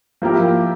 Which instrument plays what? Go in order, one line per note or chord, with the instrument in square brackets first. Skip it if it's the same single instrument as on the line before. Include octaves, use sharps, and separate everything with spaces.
[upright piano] F3 A#3 E4 G4 A#4